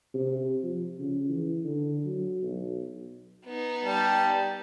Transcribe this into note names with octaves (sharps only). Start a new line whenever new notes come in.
C3
F3
C#3
E3
D3
F#3
B1
B3 D#4
G3 A5